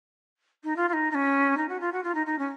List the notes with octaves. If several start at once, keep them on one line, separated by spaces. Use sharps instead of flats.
D#4
F4
F4
D#4
D#4
C#4
D#4
F#4
F4
F#4
F4
D#4
D#4
C#4